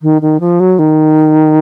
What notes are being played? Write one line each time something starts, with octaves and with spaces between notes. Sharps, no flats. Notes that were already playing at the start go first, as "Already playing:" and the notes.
D#3
D#3
F3
F#3
D#3